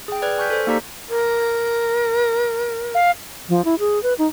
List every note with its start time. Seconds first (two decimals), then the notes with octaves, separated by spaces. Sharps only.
0.08 G#4 G5
0.22 B4 D5 F6 F#6 G#6
0.38 G#5 C#6 F6 G6 B6
0.50 A4 C5
0.67 A#3 D#4 G4 D5 A#5 B6
1.09 A#4
2.94 F5
3.49 F3
3.65 E4
3.79 G#4
4.03 B4
4.18 D#4